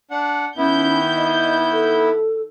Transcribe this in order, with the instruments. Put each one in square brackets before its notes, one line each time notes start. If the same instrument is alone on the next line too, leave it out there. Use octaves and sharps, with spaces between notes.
[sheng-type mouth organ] D4 F#5
[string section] D#3 G6 [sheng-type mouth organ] B3 E4 [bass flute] C#4
[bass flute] D#5
A4